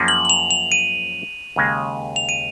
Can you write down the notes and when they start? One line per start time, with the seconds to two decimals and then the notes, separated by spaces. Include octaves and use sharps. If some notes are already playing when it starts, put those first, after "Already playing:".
Already playing: F#2 F3 A#3 C#4 G#4
0.08 F#7
0.25 F#7
0.30 F7
0.51 F7
0.72 D#7
1.56 D#2 C#3 G#3
2.16 F7
2.29 D#7